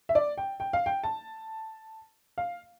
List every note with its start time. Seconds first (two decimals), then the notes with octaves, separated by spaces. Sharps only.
0.09 E5
0.15 D5
0.38 G5
0.60 G5
0.73 F5
0.86 G5
1.04 A5
2.38 F5